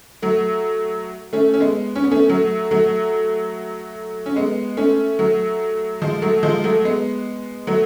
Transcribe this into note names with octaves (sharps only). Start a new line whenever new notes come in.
F#3 A3
A3 C#4
C#4
G#3 B3
C#4
B3
A3 C#4
F#3 A3
F#3 A3
C#4
G#3 B3
A3 C#4
F#3 A3
F3 G#3
F#3 A3
F3 G#3
F#3 A3
G#3 B3
F#3 A3